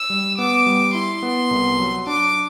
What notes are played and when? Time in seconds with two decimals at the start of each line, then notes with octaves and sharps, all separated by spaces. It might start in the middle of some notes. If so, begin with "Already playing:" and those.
Already playing: E6
0.10 G3
0.38 B3 D6
0.66 G3
0.94 E4 C6
1.23 B3
1.51 C2
1.79 F#3
2.07 D4 D6